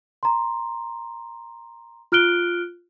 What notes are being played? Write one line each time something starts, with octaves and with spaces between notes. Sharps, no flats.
A#5 C6
F4 F6 F#6 D7 G7